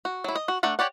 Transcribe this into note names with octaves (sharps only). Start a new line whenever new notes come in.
F#4
F#3 E4
D#5
F#4
A3 D4 F#5 A#5
G4 C#5 D5 F#5